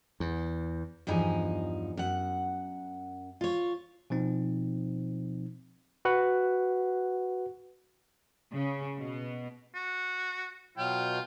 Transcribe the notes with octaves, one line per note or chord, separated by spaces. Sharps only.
E2
E2 G2 F3 D#4 G#5
F#2 F#5
F4 C#5
B2 F3 C4 D#4
F#4 B4 F#5
C#3
B2
F#4
B2 F#3 F4 G5